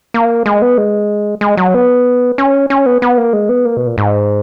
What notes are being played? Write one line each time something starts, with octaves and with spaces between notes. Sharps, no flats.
A#3
G#3
B3
G#3
G#3
F#3
B3
C#4
C#4
B3
B3
A#3
G#3
B3
A#3
B2
A#2
G#2